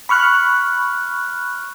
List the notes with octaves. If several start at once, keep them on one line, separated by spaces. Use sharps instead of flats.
B5 C#6 F6 F#6